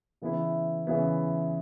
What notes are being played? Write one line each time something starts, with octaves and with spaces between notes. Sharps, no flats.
C#3 E3 B3 E4
C#3 E3 B3 E4